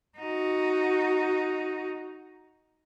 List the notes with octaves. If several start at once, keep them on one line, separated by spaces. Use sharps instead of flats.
D#4 F#4